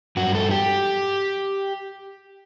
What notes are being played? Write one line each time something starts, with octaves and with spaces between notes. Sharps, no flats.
G2 F#3 F#4
A4
G4